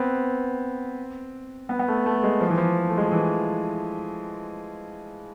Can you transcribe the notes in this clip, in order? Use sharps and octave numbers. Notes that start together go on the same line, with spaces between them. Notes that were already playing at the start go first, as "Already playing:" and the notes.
Already playing: B3 C4
B3
B3
A3
A3
G#3
F3
E3
F3
A3
G#3
F3
E3